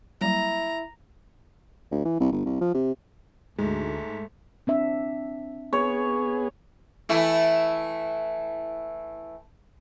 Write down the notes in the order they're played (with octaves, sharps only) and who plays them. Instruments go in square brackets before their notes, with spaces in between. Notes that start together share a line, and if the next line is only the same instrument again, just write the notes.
[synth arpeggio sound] F#3 G3 A#3 [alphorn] E4 [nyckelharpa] A#5
[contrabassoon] D2
E3
C2
G1
C2
F3
C3
[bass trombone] D2 [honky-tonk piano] G#2 [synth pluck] G#3 [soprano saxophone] A3
[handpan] C4 D4 E5
[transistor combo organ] B3 G#4 [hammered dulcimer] C#5
[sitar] E3 A3 E4